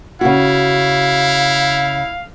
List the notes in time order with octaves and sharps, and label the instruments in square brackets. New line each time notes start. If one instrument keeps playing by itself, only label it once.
[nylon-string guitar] C#3 F#4 [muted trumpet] E4 [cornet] F5